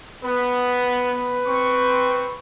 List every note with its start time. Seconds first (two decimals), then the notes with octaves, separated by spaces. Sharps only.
0.24 B3 B4
1.46 C4 C#6